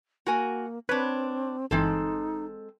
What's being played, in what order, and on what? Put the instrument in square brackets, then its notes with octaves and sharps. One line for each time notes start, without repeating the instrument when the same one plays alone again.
[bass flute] A#3 [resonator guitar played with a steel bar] F#4 A#4 G#5
[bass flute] C4 [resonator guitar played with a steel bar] D4 C#5 [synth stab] B4
[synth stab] G1 E3 [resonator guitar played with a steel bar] G#3 C4 A4 [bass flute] D#4